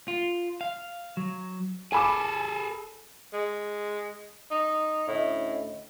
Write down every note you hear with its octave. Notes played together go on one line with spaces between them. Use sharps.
F4
F5
F#3
G#4 A4 G#5 B5 D6
G#3
D#4
D2 A2 C#4 D#5